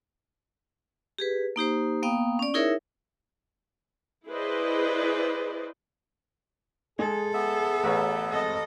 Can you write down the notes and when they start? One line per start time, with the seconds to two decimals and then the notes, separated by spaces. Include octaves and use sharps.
1.19 G4 G#4 B4
1.56 A#3 D#4 G4 C5
2.03 A#3 B3 F5 G5 D#6
2.39 C#4 D5
2.54 D#4 E4 G#4 A#4 C#5 E5
4.28 E4 G#4 B4 C5 D5 D#5
6.99 G#3 G#4 A4
7.34 B3 E5
7.84 A1 B4 C#5
8.30 G#3 C4 A4 D#5